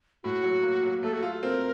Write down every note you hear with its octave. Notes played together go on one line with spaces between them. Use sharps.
A2 F#4
F#3
A#3
F#3
A3 A4
F#4
F4 A4
C4 A#4